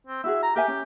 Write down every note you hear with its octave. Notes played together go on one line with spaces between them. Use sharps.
C4
E4 F#4 G#4 E5
A#5
G4 A#4 E5 G#5
C#4